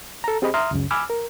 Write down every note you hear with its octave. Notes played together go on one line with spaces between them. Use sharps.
A4 A#5
C4 G4 G#4 C5 D#5 B5
E5 A#5 C6 D#6 F6
C#2 F#2 C#3
G#5 B5 D6 E6 F6
A#4